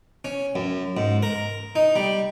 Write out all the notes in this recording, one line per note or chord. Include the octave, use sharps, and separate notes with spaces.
C#4
F#2
G#2
A#4
D#4
G3